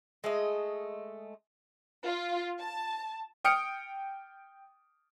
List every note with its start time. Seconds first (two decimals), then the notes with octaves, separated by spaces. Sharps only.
0.24 G#3 A3 D#5
2.05 F4
2.58 A5
3.44 G5 D#6 F6 C#7 D7